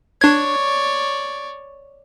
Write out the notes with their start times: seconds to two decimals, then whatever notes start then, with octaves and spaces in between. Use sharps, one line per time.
0.21 D4 C#5 D5 G#6